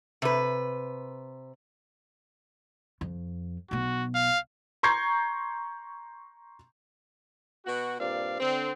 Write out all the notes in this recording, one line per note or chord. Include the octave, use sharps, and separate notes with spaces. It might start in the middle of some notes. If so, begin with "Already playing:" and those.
C3 B4
F2
B1 B3 F#4
F5
A#5 C6 C#6 G6 G#6 C7
B2 B3 F#4
G2 A#2 C4 D5 F5
D3 C4